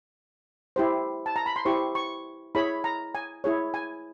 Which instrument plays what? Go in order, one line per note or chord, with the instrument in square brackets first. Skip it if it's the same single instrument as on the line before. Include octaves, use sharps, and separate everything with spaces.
[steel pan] E4 G4 C5
A5
A#5
B5
C6
E4 G4 C5 C#6
C#6
E4 G#4 C#5 B5
A#5
G#5
E4 G#4 C#5
G#5